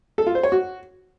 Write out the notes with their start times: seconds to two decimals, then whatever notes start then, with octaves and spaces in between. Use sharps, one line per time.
0.18 A4
0.27 F4
0.35 C5
0.43 C#5
0.52 F#4